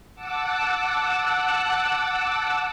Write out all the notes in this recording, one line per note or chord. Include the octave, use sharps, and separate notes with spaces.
F#5 A5 D6 E6 F#6